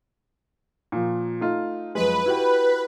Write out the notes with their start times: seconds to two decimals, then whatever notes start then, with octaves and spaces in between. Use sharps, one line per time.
0.92 A#2 F3
1.40 A3 D#4 F4
1.95 F#2 F3 G#3 B4
2.26 E4 F#4 G4